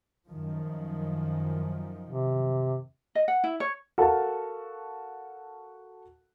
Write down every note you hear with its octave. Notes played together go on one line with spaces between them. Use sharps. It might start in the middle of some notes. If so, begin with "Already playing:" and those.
F#2 D#3 F3
C3
D#5
F#5
E4
C#5
F#4 A4 A#4 F5 A5